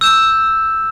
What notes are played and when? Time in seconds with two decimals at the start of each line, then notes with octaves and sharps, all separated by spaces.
0.01 E6 G6 E7